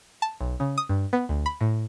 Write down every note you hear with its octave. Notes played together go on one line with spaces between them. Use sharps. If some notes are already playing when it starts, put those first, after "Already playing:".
A5
B1
C#3
D#6
G2
B3
D2
B5
A2